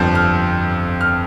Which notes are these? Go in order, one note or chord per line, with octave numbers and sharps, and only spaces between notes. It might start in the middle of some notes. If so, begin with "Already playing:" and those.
Already playing: G1 F2 F3 G6
F6
F6